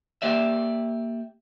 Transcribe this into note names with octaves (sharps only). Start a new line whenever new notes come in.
A#3 G4 D5 E5